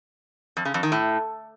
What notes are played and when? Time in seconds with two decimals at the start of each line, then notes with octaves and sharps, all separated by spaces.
0.57 F2
0.65 C#3
0.74 F2
0.83 D#3
0.92 A2